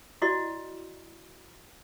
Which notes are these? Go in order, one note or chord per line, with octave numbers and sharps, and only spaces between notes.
E4 F#4 D5 D#5